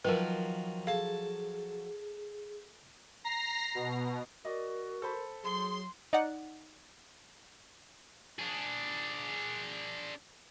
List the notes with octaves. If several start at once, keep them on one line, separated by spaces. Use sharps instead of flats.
D#3 F3 F#3 F4 A#4 B4
G#4 A4 F5 A5
A#5 A#6 C7
B2
F#4 A#4 D5 D#5
A4 C5 B5
F#3 G#4 C6
D#4 D5 F#5
D4 G#4